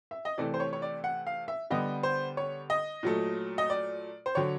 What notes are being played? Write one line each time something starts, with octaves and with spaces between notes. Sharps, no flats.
E5
D#5
C3 E3 A3 D5
C5
C#5
C#5
D5
F#5
F5
E5
D3 G3 B3 D#5
C5
C#5
D#5
A#2 F#3 A3
D#5
D5
C5
D3 F#3 C#5